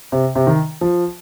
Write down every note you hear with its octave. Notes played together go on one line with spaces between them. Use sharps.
C3
C3
D#3
F3